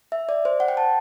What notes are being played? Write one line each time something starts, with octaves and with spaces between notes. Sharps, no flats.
E5
D5
C5
F#5
G5
A5